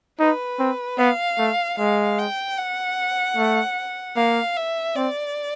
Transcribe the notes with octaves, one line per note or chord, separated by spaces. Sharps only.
D#4 B4
C4
B3 F5
A3
G#3 F5
G5
F#5
A3
A#3 F5
E5
C4 D5